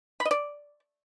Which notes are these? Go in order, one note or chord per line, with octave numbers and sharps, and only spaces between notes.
B5
D#5
D5